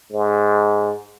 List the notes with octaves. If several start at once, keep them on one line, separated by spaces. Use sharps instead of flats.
G#2